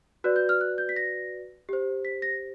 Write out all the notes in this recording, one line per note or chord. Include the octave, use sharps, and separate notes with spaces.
F#4 B4 D5 F#6
G6
F6
F#6
G6
B6
A#6
G4 C5
B6
A#6